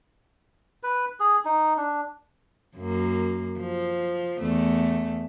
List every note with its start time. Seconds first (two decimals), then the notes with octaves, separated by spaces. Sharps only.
0.83 B4
1.20 G#4
1.45 D#4
1.77 D4
2.76 F#2 A#3
3.59 F3
4.39 E2 A3